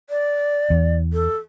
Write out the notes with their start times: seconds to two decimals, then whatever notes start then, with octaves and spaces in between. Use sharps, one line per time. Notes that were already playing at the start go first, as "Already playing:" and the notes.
0.10 D5
0.70 E2
1.13 A4